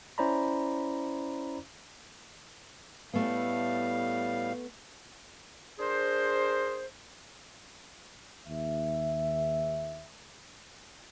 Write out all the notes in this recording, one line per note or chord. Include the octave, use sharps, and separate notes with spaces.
C#4 E4 C5 D5 A#5 B5
A2 G3 A3 B3 F5
D4 G#4 A#4 C5
D#2 E5